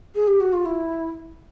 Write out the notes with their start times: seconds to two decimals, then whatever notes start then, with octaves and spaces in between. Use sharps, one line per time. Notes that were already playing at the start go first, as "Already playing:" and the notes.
0.15 G#4
0.27 G4
0.40 F#4
0.52 F4
0.65 E4